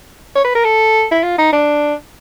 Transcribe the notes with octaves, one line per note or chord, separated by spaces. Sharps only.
C#5
B4
A#4
A4
E4
F4
D#4
D4